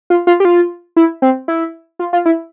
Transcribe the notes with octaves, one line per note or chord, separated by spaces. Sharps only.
F4
F4
G4
F4
E4
C4
E4
F4
F4
E4